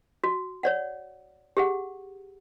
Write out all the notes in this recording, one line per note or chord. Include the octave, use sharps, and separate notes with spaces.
F#4
C#5 D5 F#5
G4 G#4 F#5